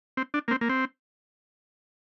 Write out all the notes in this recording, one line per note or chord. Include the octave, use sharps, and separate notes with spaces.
C4
D4
A#3
C4
A#3
C4